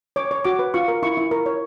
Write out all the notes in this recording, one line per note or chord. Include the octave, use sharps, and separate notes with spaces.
C#5 D6
C#5
F#4 D6
B4
F4 C#6
A#4
E4 C#6
E4
A#4
C#5